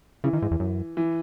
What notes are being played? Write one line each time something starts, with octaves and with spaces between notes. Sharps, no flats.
C#3 E3
D#3
G#2
E2
F#2
E3